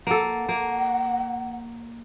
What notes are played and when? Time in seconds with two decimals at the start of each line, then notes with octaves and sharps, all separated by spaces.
0.07 A#3 A4 F#5
0.49 A#3